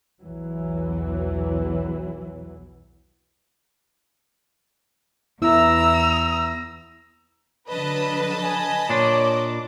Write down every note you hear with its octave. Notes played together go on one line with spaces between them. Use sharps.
B1 E2 E3 F#3
E2 B3 E4 A#5 E6
D3 F#3 B4 D#5 A5 B5
G#5
A#2 D4 C#5 D6